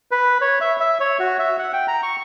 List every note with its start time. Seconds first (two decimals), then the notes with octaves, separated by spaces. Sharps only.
0.11 B4
0.41 C#5
0.61 E5
0.80 E5
1.00 C#5
1.20 F#4
1.39 E5
1.59 F#5
1.73 G5
1.88 A#5
2.03 C#6